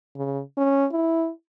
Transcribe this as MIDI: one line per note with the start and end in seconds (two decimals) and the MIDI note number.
0.16 0.41 49
0.57 0.86 61
0.92 1.30 64